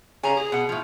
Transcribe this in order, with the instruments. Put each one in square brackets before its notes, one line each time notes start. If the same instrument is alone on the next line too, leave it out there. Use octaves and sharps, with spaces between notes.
[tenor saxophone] C#3 [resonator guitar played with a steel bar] G#5 A#5
[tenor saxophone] G#4
[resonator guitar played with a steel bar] B2 F#5
A2 F3